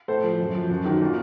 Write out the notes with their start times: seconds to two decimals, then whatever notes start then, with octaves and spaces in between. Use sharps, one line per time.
0.08 A2 A4 C5
0.23 F3
0.39 F#2
0.55 F3
0.70 F#2
0.85 D#3 F#3
1.01 A#2